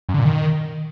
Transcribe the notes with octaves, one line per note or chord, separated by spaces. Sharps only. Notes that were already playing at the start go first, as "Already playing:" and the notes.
F#2
D3
A#2
D#3